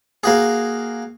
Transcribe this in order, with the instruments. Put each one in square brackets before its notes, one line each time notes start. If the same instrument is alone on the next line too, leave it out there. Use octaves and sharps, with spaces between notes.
[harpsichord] A#3 F#4 G#4